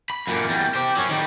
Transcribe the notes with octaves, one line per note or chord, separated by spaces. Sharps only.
B5
F#2 A#2
E2 G3
G4 C5
F#3 C#4
D#3 G3